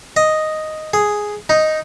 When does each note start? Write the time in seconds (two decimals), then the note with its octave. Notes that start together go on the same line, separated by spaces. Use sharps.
0.16 D#5
0.93 G#4
1.49 D#4